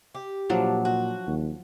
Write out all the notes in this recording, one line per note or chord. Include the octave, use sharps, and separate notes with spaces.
G4
A#2 F3 F#3 D4
F#4
D#2